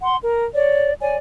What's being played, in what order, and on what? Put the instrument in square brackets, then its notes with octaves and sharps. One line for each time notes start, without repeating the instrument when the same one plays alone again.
[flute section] F#5 C6
A#4
C#5 D5
C#5 D5 G#5